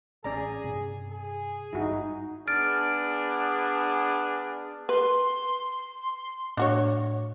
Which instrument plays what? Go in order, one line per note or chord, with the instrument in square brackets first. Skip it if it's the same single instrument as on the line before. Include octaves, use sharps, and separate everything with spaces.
[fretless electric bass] A1 [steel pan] C#4 D5 A#5 [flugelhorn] G#4
[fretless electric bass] G2 C3 C4
[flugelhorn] G#4
[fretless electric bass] G#1 G2 [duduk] D#4 [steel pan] E4 F#4
[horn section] B3 D4 G#4 [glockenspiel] F6 A6 D7
[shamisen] B4 [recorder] C6
[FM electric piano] A2 [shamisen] D4 F#4 C#5